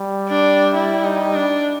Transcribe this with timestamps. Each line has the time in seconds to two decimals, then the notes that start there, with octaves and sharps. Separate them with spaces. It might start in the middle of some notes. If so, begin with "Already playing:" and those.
Already playing: G3
0.29 D4
0.74 E4
1.04 D#4
1.34 D4